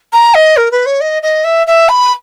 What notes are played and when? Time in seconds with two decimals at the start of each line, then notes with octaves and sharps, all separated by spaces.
0.13 A#5
0.34 D#5
0.57 A#4
0.71 B4
0.86 C#5
1.01 D#5
1.22 D#5
1.44 E5
1.67 E5
1.89 B5